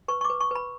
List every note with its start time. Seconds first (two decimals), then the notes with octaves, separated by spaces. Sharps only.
0.08 B4 C#6
0.21 C#6
0.24 D6
0.30 B4
0.40 C#6
0.51 B4 B5